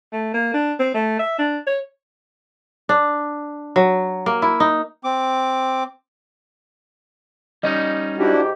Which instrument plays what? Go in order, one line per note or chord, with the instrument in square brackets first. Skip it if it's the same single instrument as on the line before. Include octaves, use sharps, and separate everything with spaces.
[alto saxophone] A3
A#3
D4
C4
A3
E5
D4
C#5
[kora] D4
F#3
A#3
E4
D#4
[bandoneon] C4 D6
[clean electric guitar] G3 C#4 D#4 [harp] D#5
[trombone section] G#2 G4 [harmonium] D4 E4 F#4